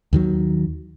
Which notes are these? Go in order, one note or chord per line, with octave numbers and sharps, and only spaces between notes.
D#2 D#3 F#3